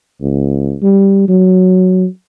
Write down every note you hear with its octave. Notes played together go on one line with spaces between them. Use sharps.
C#2
G3
F#3